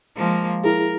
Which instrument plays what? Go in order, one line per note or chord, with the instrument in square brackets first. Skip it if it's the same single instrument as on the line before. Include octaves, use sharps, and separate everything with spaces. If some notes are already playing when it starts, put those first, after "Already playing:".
[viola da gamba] F3 G#3 A#3
[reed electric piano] E4 G#4 [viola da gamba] A#4